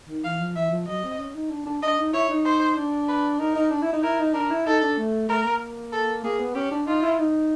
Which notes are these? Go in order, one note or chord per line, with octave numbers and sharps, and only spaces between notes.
D#3
E3 F5
F3
E3 E5
F3
F#3 D#5
C4
C#4
D#4
D4
D4
D4 D#5
D#4
E4 C#5
D#4
C5
D4
B4
D#4 A#4
D#4
D4
E4
D#4
E4 A#4
D#4
D4 A#4
E4
D#4 A4
D4
A3
A3 A#4
A#3
A4
A#3 G#4
B3
C#4 G4
D4
D#4 F4
E4
D#4